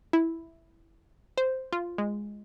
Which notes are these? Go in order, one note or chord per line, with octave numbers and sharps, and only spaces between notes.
E4
C5
F4
G#3